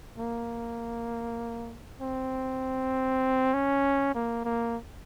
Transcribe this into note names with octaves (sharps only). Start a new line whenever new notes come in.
A#3
C4
C#4
A#3
A#3